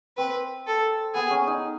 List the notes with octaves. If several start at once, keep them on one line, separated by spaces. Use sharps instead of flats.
C4 B4
A4
B3 G#4
C#4
D#4